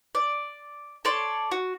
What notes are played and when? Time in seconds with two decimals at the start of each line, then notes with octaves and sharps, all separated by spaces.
0.15 D5
1.05 A4 C#5 D5 C6
1.52 F#4